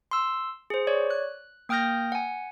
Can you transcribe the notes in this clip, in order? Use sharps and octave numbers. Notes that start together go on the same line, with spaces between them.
C6 E6
G#4 C5
C#5 D5
F#6
A#3 G5 D#6 F6 G6 A#6
F#5 G#5